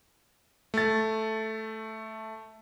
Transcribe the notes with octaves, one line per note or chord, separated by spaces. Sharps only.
A3 A6